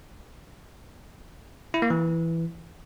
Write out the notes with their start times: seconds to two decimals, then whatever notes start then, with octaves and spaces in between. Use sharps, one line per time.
1.74 E4
1.82 A#3
1.90 E3